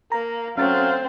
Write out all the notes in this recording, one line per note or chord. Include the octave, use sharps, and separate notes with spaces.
A#3 A#5
F#3 A3 C4 C#4 F5 A6